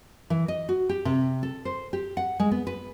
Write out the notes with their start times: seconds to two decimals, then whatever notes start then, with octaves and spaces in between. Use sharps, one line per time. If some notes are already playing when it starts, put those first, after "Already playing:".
0.30 E3
0.48 D#5
0.69 F#4
0.89 G4
1.05 C3
1.43 A4
1.65 C5
1.93 G4
2.17 F#5
2.40 G#3
2.51 B3
2.67 B4